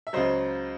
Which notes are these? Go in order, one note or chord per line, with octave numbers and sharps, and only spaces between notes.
E5
C#2 C#3 F#3 C5 D#5